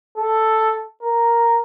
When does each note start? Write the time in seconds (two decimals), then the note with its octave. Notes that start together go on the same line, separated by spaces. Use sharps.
0.18 A4
1.03 A#4